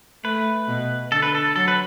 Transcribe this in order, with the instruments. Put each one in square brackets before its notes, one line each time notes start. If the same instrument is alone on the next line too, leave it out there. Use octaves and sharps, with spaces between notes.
[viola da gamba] A3 [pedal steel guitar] B4
[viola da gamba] B2
[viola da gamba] D3 [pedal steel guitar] A4
[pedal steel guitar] B4
A4
[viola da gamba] F#3 [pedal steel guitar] A4
[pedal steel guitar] B4